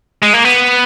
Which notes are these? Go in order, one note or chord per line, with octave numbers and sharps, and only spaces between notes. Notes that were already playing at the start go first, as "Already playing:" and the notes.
G#3
A#3
B3